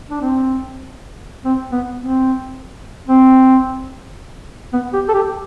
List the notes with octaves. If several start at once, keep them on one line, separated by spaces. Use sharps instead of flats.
D4
C4
C4
B3
C4
C4
B3
G4
A4
G4